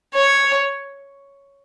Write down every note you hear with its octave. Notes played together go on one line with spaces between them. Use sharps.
C#5